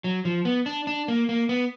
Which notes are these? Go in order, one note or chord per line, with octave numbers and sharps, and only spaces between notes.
F#3
F3
B3
D4
D4
A#3
A#3
B3